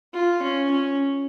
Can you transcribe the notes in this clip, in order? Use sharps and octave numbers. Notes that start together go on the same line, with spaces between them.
F4
C#4
C#4